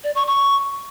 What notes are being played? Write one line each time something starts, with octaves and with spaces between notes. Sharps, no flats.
D5
C#6
C#6